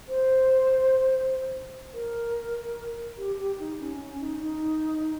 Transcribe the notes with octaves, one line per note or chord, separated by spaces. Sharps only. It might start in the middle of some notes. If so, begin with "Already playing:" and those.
C5
A#4
G4
G4
D#4
C#4
C#4
D#4
D#4